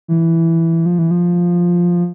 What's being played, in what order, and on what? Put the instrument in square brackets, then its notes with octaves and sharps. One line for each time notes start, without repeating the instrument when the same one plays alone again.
[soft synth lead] E3
F3
E3
F3